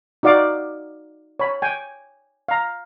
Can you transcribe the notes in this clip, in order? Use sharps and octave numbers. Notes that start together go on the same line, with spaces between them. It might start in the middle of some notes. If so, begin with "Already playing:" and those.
D#4 F#4 D5 F5 D6
C#5 B5
G5 G#5
F5 A#5